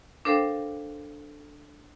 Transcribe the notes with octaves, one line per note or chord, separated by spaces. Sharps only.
D4 A4 A#4 C5 F5 G5